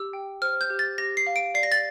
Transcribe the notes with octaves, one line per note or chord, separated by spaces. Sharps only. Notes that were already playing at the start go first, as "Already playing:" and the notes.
Already playing: G4 E6
G5
C5 F6
G6
G4
A6
G4 A#6
C7
F5
D7
D5 C7
A#6
A6